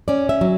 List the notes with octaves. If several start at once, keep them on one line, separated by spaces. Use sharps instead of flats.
C#4 D5
E5
F#3